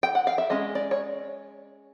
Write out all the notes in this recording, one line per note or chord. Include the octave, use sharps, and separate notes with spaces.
G5
F#5
F5
E5
G#3 C#4 D#5
D5
C#5